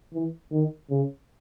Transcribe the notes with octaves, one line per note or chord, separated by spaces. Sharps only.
E3
D#3
C#3